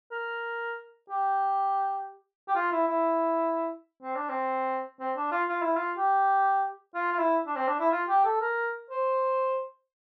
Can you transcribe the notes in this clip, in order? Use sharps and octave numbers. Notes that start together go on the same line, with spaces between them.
A#4
G4
G4
F4
E4
E4
C4
D4
C4
C4
D4
F4
F4
E4
F4
G4
F4
F4
E4
D4
C4
D4
E4
F4
G4
A4
A#4
C5